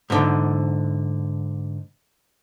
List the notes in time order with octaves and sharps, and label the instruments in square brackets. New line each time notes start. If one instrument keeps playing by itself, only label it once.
[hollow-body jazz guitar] G#2 D3